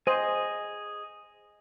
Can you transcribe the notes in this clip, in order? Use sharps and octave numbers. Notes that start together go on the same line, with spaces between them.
G#4 C5 D#5 G#5